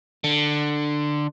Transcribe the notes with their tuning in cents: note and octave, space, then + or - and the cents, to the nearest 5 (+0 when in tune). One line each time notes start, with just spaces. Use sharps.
D3 +15